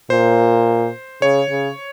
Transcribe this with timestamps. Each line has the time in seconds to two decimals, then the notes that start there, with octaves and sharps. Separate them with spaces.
0.10 A#2 C5
1.22 C#3 C#5
1.50 C#3